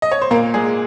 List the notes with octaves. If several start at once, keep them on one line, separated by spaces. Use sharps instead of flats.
D#5
C#5
C5
A#2 A#3 A#4
G#3 G#4